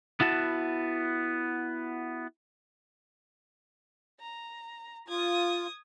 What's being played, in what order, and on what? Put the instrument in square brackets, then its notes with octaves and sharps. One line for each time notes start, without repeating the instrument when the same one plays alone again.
[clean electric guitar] B3 E4 F#4 A5
[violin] A#5
[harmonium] F4 [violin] D#6 G#6